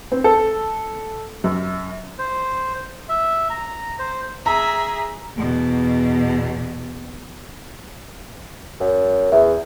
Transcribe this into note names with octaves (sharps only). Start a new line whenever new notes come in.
C4
A4
F#2
C5
E5
A#5
C5
G#4 E5 A#5
E2 B2
F#2
E2 E5